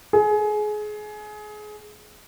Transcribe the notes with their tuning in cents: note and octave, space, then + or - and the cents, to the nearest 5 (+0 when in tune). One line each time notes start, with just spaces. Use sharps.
G#4 +25